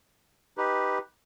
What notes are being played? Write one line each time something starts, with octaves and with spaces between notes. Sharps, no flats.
D#4 G4 B4